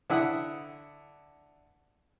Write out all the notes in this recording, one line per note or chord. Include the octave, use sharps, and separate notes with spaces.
D3 E4 F#5 D#6